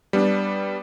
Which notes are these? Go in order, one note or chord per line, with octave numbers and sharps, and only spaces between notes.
G3 B3 D4